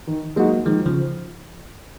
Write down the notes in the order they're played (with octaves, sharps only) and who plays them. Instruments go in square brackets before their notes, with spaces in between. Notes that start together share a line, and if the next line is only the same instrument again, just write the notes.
[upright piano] D#3
[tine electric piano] F#3 A#3 [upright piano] G#3 D#4 F#4
[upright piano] D#3 [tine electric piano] F3 G#3
[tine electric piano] C#3 F3